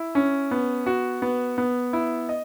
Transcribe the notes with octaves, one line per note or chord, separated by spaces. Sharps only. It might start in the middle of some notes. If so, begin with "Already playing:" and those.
Already playing: E4
C#4
B3
F#4
B3
B3
E4
D#5